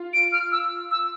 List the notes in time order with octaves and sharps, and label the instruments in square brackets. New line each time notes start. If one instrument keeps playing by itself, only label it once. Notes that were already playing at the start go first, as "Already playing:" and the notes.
Already playing: [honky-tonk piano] F4
[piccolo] D7
F6
E6
E6